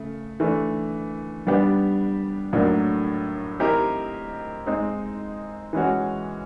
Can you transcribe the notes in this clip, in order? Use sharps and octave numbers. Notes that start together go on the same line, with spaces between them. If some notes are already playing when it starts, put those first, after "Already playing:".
Already playing: C#3 A3
E3 A3 D4
G3 B3 D4 G4
A2 F#3 A#3 D4
C4 E4 G4 A#4 D#5
G#3 C4 D#4
E3 G#3 C#4 F#4